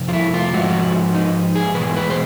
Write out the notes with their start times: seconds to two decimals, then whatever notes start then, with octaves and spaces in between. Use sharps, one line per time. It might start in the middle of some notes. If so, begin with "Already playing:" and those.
Already playing: F2 C3
0.09 F4
0.13 E4
0.34 F4
0.53 G#2 F3 G#3 F#4
1.15 D#4
1.56 G#4
1.75 E2 B2 G#3 B4
1.96 B4
2.10 C5